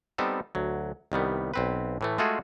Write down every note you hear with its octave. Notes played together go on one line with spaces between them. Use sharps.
G3 B3 C4 D#4 A4
D2 F#3
C2 D#3 G3 B3
B1 C4 B4
A2 E3 A3
G#3 A3 F4 F#4 G#4 A4